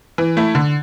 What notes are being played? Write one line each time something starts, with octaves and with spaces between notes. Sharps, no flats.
E3
A3 E4
D3